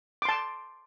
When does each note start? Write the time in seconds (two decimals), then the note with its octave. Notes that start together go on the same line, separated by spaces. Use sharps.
0.22 D6
0.25 C6
0.29 A5